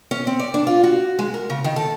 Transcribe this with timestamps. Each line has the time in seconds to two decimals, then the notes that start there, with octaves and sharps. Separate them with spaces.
0.11 C#4
0.27 C4
0.39 D5
0.54 D4
0.67 F4
0.83 F#4
1.19 G#3
1.34 A#4
1.50 C#3
1.64 D#3
1.76 A4